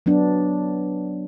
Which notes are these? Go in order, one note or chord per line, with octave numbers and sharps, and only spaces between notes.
F#3 B3 D4